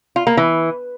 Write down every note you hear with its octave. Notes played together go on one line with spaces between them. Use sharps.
F4
A#3
E3